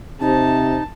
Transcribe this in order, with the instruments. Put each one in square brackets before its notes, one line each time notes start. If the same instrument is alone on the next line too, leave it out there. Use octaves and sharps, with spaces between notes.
[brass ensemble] C3 [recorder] D#4 [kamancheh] A5